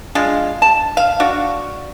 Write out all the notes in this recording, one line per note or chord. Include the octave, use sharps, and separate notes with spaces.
G#3 D4 F4 F5
A5
F5
D4 F#4